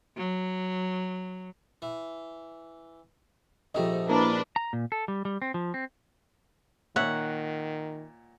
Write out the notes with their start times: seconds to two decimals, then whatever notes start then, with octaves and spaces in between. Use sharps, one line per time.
0.17 F#3
1.82 E3
3.75 A#1 G#2 F3 A3 G4 D#5
4.09 A#3 D4 E4 A#4 B4
4.56 A#5
4.73 A#2
4.92 A4
5.08 G3
5.25 G3
5.42 C4
5.54 F3
5.74 C4
6.96 A#2 D#3 C#5 E5 F#5